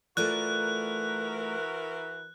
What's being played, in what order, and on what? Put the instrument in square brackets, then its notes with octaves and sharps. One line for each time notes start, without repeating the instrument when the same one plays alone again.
[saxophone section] E3 F#4 A#4 [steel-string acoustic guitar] A3 F4 D5 [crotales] F#6